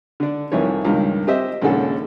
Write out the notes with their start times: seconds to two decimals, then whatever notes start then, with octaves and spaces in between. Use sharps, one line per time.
0.20 D3 D4
0.52 C2 F2 D#3 E3 C#5
0.84 C#2 G2 D#3
1.27 C4 G4 C5 D#5 E5
1.62 A#1 D#2 C#3 G#3 A4 F#5